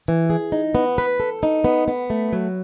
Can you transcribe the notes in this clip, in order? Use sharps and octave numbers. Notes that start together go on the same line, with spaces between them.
E3
G#4
D#4
B3
B4
A4
D#4
B3
B3
A3
F#3